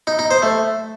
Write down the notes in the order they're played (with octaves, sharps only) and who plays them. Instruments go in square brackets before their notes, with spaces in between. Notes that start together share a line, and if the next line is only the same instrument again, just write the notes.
[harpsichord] D#4
D#4
C5
A3